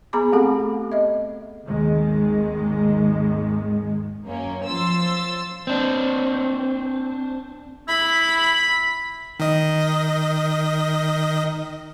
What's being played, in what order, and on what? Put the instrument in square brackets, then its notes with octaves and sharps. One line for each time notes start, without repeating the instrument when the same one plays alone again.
[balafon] B3 G#4 A#5 B5 D6
A3 C4 G4 A4 F#5
D#5 E5
[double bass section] G#1 D#2 D#3 G#3
[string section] F#2 A#3 C#4
F3 C6 E6 A6
[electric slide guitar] C4 D4
[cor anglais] E4 [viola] B5
[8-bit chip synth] D#3 D#5